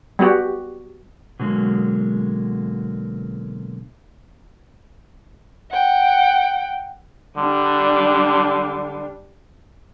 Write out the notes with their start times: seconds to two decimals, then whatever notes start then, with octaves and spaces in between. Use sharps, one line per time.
0.19 G3 B3 F#4 G4
1.39 B2 D3 F#3 G#3 A#3
5.71 F#5 G5
7.37 D3 G3 D4